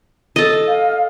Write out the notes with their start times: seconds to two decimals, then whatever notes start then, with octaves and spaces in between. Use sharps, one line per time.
0.36 A4 D#5
0.67 F5